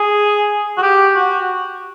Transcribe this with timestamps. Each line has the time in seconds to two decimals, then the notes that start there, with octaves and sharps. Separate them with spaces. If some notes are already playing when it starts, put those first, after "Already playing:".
Already playing: G#4
0.77 F#4
0.82 G4
1.16 F#4